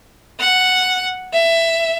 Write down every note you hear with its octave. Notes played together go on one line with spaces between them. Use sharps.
F#5
E5